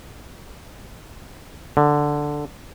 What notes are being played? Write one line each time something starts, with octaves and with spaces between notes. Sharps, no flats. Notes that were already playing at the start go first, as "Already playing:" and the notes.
D3